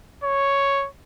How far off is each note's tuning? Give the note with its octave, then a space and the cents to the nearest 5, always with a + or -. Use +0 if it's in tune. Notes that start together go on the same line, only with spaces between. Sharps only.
C#5 +0